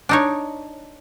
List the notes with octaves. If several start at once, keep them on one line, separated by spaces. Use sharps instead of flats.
D4 D#4 C#5